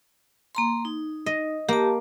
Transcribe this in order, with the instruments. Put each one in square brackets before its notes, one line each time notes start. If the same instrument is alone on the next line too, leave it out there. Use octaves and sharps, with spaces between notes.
[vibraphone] A#3 A#5 C6
D#4
[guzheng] D#5
[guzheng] A#3 [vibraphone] G4 A5